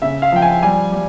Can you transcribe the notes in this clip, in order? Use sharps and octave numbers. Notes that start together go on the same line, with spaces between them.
C#3 E5
F5
F3 G5
G#5
G3 G#5
G3